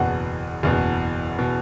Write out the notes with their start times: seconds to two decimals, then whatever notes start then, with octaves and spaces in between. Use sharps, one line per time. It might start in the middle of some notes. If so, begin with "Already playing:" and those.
Already playing: F#1 E2 B2 F#5
0.63 F#1 E2 B2
1.39 B2